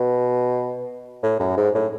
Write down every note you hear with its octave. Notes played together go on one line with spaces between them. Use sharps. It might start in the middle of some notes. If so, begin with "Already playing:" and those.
Already playing: B2
A2
F#2
G#2
A2